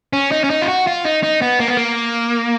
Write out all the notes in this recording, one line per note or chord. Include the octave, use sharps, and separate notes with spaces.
C#4
D#4
C#4
D#4
F4
F#4
F4
D#4
D#4
B3
A#3
B3
A#3